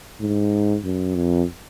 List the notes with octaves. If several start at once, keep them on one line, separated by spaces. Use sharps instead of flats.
G#2
F#2
F2